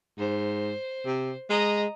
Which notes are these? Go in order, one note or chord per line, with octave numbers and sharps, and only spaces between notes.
G#2 C5
C3
G#3 D#5 A#5